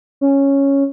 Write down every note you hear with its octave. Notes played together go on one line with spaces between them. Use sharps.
C#4